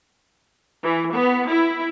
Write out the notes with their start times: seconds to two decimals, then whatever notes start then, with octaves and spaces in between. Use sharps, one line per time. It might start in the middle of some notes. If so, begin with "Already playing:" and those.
0.84 E3
1.14 B3
1.50 E4